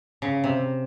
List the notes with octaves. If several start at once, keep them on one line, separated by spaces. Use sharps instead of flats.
C#3
C3